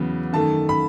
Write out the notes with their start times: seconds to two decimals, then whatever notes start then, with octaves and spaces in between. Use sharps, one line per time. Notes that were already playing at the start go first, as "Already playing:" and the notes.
Already playing: E2 C#3 F#3 B3
0.33 F#2 D#3 A3 A5
0.69 B5